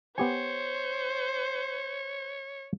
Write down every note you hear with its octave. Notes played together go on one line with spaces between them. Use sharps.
B3 G4 C5 C#5 G#5